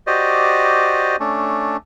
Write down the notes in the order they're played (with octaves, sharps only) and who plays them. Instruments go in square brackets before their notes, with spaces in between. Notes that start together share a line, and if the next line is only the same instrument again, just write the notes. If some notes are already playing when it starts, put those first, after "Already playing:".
[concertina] F#4 G4 C5 D5 D#5
A3 C#4 D4